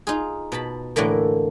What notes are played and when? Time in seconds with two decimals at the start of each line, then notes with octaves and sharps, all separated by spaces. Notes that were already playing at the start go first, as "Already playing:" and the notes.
0.07 D#4 F4 G#4
0.52 B2 A5 B5
0.96 A2 D3 E3 A3 A#3